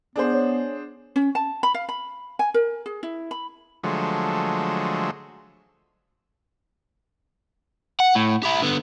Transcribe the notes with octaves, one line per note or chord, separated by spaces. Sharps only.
B3 D4 G#4 C5
C#5
C#4
A5
B5
F5
B5
G#5
A#4
G#4
E4
B5
D3 F3 F#3 G#3 A3
F#5
A2
E4 G4
D3 B3